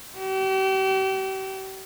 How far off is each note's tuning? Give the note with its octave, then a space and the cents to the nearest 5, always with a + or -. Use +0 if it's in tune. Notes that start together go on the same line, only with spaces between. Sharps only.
G4 -40